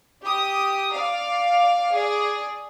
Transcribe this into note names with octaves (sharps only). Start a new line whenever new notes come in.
G4 D#6
D5 F5
G#4 D5